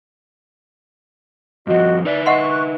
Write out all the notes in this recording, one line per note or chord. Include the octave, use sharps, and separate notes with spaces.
G2 F3 F#4 D#5
D#4 B4 D5 E5
D#5 F#5 C6 C#6 F#6